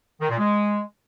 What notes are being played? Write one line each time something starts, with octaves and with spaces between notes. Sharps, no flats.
D#3
A#2
G#3